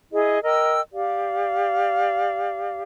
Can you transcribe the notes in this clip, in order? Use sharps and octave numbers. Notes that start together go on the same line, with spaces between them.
E4 G#4 D#5
A#4 D#5 G5 E6
G4 D5 F5